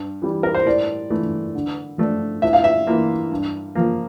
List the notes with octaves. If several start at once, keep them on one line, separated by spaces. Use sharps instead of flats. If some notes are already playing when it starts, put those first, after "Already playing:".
Already playing: G2
E3 G3
A#4
C5
A2 D5
E3 A3
D3
F3 A3 D4
A2 E5
F5
E5
E3 A#3 F4
G2
F3 A#3